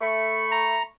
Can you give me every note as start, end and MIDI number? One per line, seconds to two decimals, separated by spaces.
0.01 0.84 57
0.01 0.84 83
0.01 0.84 85
0.52 0.83 82